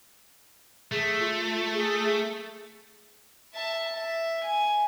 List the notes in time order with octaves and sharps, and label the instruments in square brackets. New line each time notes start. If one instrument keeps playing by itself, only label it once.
[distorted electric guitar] A3 [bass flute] G#4
[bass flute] F4
G#4
[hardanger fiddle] E5 A5
E5
G#5